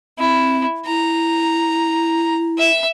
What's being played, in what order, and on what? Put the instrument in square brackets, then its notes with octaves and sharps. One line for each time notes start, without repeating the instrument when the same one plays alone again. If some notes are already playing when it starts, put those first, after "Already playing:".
[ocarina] C4 [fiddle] E4
[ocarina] E4 [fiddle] A#5
[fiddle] E5 E6